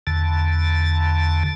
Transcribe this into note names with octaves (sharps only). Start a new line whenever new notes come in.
E2 D3 A5